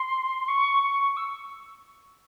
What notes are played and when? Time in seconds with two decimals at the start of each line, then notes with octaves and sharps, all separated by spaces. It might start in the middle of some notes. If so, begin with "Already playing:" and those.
Already playing: C6
0.48 C#6
0.84 C#6
1.17 E6